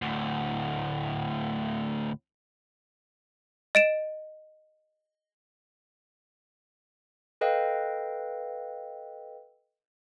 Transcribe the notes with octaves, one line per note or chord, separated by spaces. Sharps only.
D2 A2
D#5 D7 E7
A4 B4 D#5 F5 G5